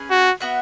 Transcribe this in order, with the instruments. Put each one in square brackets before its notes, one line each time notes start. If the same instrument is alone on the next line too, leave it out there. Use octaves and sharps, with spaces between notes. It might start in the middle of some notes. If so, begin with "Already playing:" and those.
Already playing: [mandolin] C#4 G#4 B4
[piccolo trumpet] F#4
[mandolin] B3 F#4 E5